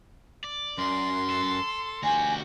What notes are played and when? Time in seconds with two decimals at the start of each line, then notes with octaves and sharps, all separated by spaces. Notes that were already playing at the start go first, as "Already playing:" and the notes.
0.44 D5
0.78 F#2 C6
1.30 A4
2.03 D2 F#4 G4 G#5